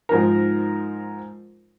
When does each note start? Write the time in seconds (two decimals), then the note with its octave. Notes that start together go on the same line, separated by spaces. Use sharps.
0.09 G#2 F3 D#4 A#4